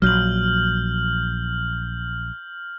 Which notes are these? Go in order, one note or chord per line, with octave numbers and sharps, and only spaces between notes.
A#1 F#3 F6 G6 F#7